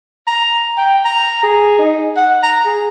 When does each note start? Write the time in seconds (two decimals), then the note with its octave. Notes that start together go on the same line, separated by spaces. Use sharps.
0.27 A#5
0.78 G5
1.05 A#5
1.43 G#4
1.79 D#4
2.17 F#5
2.43 A#5
2.66 G#4